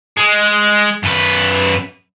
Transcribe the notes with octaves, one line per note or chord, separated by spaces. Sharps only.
G#3
F#2 B4